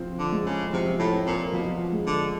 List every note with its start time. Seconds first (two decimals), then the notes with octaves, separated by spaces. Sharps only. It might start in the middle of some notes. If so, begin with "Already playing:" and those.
Already playing: F3 C4
0.19 D3
0.32 G#3
0.46 C#3
0.73 C3 F3
0.99 A2
1.13 C4
1.26 A#2
1.53 B2 F3
1.92 G#3
2.07 D3